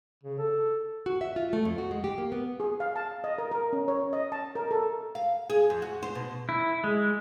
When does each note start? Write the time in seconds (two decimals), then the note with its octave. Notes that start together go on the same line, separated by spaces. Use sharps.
0.23 C#3
0.39 A4
1.06 F#4
1.21 E5
1.36 F4
1.53 A3
1.65 F2
1.78 F#4
1.91 G#3
2.04 G4
2.18 A#3
2.32 B3
2.60 G#4
2.80 F5
2.96 A5
3.24 D#5
3.38 A#4
3.51 A#4
3.73 C#4
3.88 C#5
4.13 D#5
4.32 A5
4.55 A#4
4.71 A4
5.15 F5
5.50 G#4
5.70 F2
5.82 F#4
6.03 C5
6.15 B2
6.49 E4
6.84 G#3